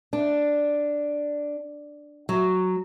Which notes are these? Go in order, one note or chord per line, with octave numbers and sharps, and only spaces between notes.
D4
F#3